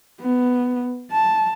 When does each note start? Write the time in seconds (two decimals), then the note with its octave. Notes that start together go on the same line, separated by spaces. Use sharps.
0.20 B3
1.11 A5